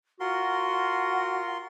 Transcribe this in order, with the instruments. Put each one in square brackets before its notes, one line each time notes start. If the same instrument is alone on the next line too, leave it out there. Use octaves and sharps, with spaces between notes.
[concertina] F4 A#4 C6 [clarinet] F#4 [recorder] F#5